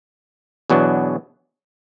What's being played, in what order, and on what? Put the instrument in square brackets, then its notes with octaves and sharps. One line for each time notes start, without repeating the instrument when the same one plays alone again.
[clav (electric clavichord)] E2 B2 F#3 B3 D4